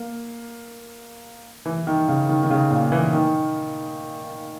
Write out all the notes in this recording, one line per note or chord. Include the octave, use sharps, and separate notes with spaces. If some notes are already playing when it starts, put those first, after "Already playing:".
Already playing: A#3
E3
D#3
C#3
D#3
D#3
C#3
A#2
E3
D#3